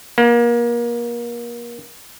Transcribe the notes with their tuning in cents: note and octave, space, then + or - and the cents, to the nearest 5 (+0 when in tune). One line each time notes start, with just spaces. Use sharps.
A#3 +30